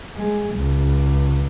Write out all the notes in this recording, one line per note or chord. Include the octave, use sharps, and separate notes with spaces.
G#3
C#2